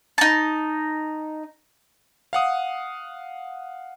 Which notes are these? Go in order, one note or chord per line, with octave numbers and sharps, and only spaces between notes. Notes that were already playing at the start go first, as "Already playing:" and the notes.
D#4 A5
F5 F#5 D#6